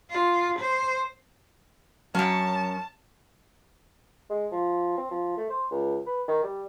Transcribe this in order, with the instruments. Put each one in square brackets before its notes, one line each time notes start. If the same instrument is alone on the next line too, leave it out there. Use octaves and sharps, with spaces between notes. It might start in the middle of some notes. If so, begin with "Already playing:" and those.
[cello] F4
C5
[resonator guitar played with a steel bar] F#2 C#4 [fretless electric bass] F#3 [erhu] A5
[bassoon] G#3
F3
C4
F3
A3
C5
C#2
B4
D#3
G3